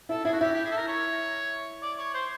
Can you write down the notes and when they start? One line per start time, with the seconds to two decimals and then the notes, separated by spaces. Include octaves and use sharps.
0.09 E4 A4
0.25 E4 G#4
0.33 F#4
0.41 E4 G4
0.53 G4
0.65 G#4
0.71 A4
0.77 A#4
0.88 C#5
1.82 D5
1.98 C#5
2.14 C5